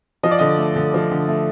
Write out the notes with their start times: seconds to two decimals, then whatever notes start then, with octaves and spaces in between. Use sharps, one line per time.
0.23 F3 D#5
0.31 D5
0.39 D3 D#5
0.58 A3
0.76 D3
0.94 F3
1.11 D3
1.28 A3